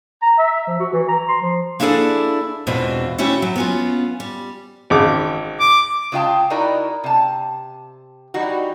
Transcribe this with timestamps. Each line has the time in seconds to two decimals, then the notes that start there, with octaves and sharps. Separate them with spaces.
0.22 A#5
0.38 E5
0.67 F3
0.80 F#4
0.93 E3
1.08 A#5
1.28 C6
1.42 F3
1.80 A#3 D4 E4 G#4 A4 D5
2.67 E2 B2 G#3 C4 D4 F4
3.18 G3 A3 C#4 E4 F#4
3.42 F#3
3.56 B3 C#4 F4
4.20 G3
4.90 G#1 C#3 D6
5.60 D6
6.12 C#3 G#3 F4 F5 G5 A5
6.50 D#4 E4 F#4 A#4 D5 D#5
7.04 C3 A5
8.34 E3 G3 D#4 F#4